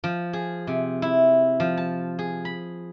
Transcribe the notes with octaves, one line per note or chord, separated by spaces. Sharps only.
F3
G#4
C3
E4
F3
A5
G#4
B5